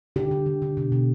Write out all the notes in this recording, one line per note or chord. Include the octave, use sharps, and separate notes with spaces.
D3 G4
D3
D3
D3
B2
B2